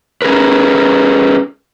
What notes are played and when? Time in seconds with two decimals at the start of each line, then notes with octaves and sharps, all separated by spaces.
0.22 C#4 G#4 A#4 B4